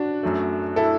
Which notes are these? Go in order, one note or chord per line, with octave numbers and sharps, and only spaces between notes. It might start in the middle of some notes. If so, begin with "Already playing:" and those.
Already playing: D4 F#4
F#2 F#3 A3
E4 A4